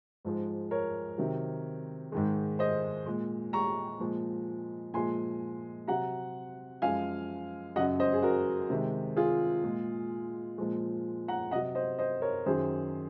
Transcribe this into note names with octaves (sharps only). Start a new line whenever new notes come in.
G#2 F3 G#3
A#4 C#5
C3 D#3 F#3
G#2 D#3 G#3
C5 D#5
A#2 G#3
A#5 C#6
A#2 F3 G#3
A#2 F3 G#3 G#5 C6
C3 F#3 F#5 A#5
F#2 F3 G#3 F5 G#5
F#2 C#3 F#3 D#5 F#5
C5 D#5
G#4
F#4 A#4
C3 D#3 G#3
F4 G#4
A#2 G#3
A#2 F3 G#3
F#5 A#5
C3 F#3 D#5 F#5
C5 D#5
C5 D#5
A#4 C#5
F#2 D#3 F#3 G#4 C5